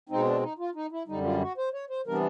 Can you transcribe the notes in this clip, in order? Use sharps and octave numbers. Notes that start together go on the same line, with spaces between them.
B2 G#3 C4 D#4
D4
D#4
F4
D#4
E4
F#2 D3 G3 D#4
F4
F#4
C5
C#5
C5
C3 E3 G3 B3 D4 A#4